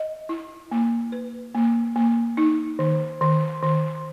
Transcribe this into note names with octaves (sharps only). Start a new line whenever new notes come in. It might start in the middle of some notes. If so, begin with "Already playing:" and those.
Already playing: D#5
E4
A#3
B4
A#3
A#3
D#4
D#3
D#3
D#3